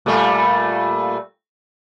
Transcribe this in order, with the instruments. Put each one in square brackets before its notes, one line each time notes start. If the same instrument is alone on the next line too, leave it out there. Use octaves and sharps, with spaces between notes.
[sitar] A#2 G3 A3